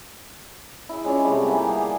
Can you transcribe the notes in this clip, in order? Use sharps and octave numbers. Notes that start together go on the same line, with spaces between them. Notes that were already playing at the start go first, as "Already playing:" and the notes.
E4 G#4
G#3 C#4 F4 D5
C3 G3 A3
E3 G3 A#3 B3
G#4